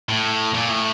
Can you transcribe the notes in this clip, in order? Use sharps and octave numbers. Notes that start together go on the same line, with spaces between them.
A2
A#2
A2